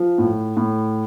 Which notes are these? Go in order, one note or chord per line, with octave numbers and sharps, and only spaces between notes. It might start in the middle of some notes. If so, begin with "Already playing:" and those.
Already playing: F3
A2
A2